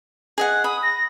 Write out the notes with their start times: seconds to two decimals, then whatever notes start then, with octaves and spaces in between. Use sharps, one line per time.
0.38 G#4 D#5 F#5
0.64 B5 D#6
0.83 A#6